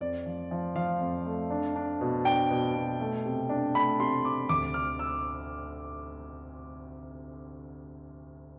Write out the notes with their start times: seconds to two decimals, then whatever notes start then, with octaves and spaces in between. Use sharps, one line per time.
0.01 F2 D5
0.26 F3
0.51 F3
0.76 F3 F5
1.00 F2
1.25 A3
1.50 D4
1.76 D4
2.01 B2
2.25 D4 G5
2.50 B2
2.75 B2
3.00 A3
3.25 C3
3.49 D4
3.74 A3 B5
4.00 C3 C6
4.25 C3 D6
4.49 D2 D6
4.74 D3 F6
4.99 E6